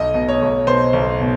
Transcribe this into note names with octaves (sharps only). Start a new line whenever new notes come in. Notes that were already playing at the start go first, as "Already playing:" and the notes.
Already playing: B1 D#5
B2
C#5
B1
B2 C5
B1
B2